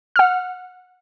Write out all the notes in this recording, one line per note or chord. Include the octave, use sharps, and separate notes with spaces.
F#5 F6